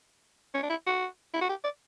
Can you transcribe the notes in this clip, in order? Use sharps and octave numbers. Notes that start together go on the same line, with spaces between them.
C#4
D4
E4
F#4
E4
F#4
G4
D5